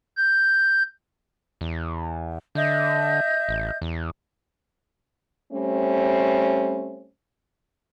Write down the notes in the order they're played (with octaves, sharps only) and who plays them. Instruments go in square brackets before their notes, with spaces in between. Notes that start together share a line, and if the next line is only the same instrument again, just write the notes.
[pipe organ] G6
[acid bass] E2
[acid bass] D3 [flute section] D#5 E5 G6
[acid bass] A1
E2
[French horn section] G3 A3 C4 C#4